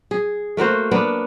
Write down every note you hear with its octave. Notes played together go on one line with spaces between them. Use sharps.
G#4
A3 A#3 F#4 C5
A#3 B3 D4